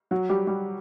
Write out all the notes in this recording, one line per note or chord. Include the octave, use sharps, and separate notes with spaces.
F#3 F#4
G3 G4
G3 G4